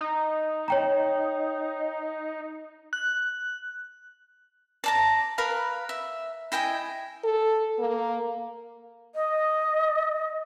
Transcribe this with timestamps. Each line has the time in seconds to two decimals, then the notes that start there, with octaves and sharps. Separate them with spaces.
0.01 D#4
0.68 C#5 G5 A#5
2.93 F#6
4.84 D5 A5 A#5
5.38 A#4 B4 F5 B5
5.89 E5
6.52 E4 D#5 G5 G#5
7.24 A4
7.79 A#3
9.13 D#5